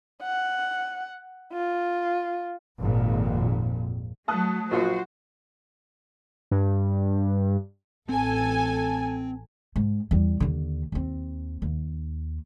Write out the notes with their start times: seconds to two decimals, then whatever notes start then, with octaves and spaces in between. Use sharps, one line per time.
0.23 F#5
1.52 F4
2.80 G#1 F2 A#2
4.28 F#3 A3 A5 D#6 F#6
4.71 A#1 F4 F#4 C5
6.51 G2
8.09 A1 C4 A4 G#5
9.76 G#2
10.11 E2 G3
10.40 D#2 D3
10.92 D#2 C4
11.62 D#2